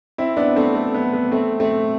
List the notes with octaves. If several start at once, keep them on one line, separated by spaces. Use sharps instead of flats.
C4 E4
B3 D4
A3 C4
A3
B3
B3
A3 C4
A3 C4